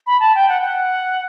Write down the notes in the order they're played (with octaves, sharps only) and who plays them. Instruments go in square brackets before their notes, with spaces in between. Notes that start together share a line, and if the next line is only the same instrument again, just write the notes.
[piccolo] B5
A5
G5
F#5
F#5